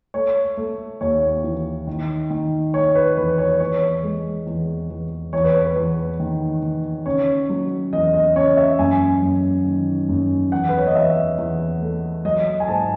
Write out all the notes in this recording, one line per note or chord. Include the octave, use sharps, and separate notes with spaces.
A3 C#5
A3
D#2 C#5
E3
D#3
D#3
A3 C#5
B4
E2 B4
C#5
E2 C#5
G#3
E2
E2
E2 C#5
B4
B4
E2
D#3
D#3
C#3 C#5
F#3
E2 D#5
D#5
C#3 C#5
E5
F#2 G#5
F#2
D#3
F#2
E2 F#5
B4
C#5
D#5
E2 E5
E2
A3
F#3 D#5
G#5
G#2 A5